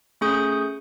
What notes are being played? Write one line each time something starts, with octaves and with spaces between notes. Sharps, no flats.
A3 C#4 G#4 C#6 D#6 G6